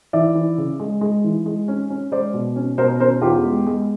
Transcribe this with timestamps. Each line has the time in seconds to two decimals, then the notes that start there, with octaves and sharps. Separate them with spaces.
0.13 E3 D5 E5
0.35 E3
0.58 C#3
0.80 G#3
1.01 G#3
1.24 E3
1.46 G#3
1.68 C#4
1.90 C#4
2.12 G#3 C5 D5
2.34 B2
2.56 C#4
2.78 B2 A#4 C5
3.00 C#4 A#4 C5
3.22 E2 F4 G4
3.44 G#3
3.67 G#3